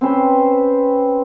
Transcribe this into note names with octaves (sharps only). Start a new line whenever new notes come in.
C4 C#4 B4 C5